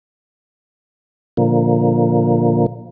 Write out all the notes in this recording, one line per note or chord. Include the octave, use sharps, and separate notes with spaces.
A#2 D3 F3 A#3